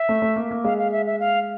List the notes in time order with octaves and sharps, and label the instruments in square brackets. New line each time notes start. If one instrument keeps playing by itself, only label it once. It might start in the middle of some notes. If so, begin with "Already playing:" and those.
Already playing: [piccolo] E5
[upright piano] A3
A3
A#3
A#3
[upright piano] G#3 [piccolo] F5
[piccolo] F5
E5
E5
F5